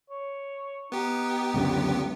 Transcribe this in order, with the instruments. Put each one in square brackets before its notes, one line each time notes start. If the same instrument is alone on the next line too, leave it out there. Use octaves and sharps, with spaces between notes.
[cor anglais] C#5
[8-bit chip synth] B3 G4 [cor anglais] D#4
[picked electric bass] C#2 F#2 D3